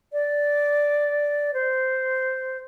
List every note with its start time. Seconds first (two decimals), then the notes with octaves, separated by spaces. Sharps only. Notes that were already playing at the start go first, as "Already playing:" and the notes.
0.13 D5
1.54 C5